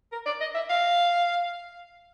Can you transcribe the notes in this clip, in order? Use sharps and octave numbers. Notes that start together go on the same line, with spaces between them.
A#4
D5
D#5
E5
F5